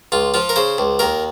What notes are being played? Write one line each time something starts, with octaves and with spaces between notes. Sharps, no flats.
C#2 F4
F3 F4
A#4
C#3 C5
C#2
D#2 A#4